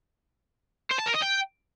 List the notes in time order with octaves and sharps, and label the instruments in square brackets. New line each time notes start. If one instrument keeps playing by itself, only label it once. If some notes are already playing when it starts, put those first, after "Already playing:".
[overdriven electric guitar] C5
A5
A#4
D#5
G5